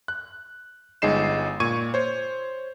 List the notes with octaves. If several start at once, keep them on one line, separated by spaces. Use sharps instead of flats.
F#6
G1 G#3 D#4 C7 E7
A#2 C#6 G#6 D#7
C5 C#5